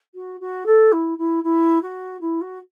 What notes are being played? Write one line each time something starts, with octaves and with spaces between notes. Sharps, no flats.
F#4
F#4
A4
E4
E4
E4
F#4
E4
F#4